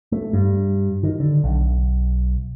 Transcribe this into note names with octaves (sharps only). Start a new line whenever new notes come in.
A3
G2
D#3
D3
B1